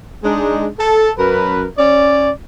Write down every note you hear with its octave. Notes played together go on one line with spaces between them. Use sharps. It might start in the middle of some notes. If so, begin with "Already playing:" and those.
G#3 D4 D#4
A4
F#2 A#4 B4
C#4 D5